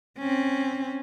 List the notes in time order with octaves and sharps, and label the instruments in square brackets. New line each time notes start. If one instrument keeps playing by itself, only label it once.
[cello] C4 C#4